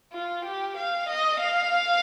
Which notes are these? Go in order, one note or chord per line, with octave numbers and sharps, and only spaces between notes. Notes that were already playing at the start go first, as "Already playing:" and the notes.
F4
G4
F5
D#5
F5